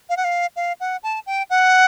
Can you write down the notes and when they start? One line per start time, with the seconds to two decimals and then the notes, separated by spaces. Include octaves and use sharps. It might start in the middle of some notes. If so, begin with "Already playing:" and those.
0.09 F5
0.17 F#5
0.24 F5
0.56 F5
0.80 F#5
1.03 A5
1.26 G5
1.50 F#5